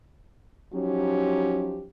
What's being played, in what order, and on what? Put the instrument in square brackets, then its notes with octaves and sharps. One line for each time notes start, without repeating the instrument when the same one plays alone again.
[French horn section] F3 F#3 C#4 D#4 G4